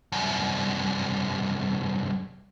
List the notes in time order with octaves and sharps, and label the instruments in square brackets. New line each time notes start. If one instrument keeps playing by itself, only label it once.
[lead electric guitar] C2 F#2